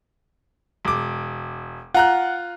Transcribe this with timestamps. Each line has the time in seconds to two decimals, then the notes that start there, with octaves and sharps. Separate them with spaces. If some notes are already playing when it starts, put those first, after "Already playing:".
0.85 E1 D6
1.94 F4 F#5 A#5 F#6